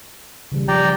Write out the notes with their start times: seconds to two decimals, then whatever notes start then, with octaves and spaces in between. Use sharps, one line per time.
0.52 C#3 E3 G3
0.68 F3 G4 D5 G5 A#5